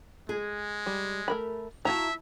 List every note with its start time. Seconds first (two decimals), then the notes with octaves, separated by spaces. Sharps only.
0.29 G#3 G#4
0.86 G3
1.28 A3 A#4 B5
1.85 E4 F#4 E5 F5 A5 A#5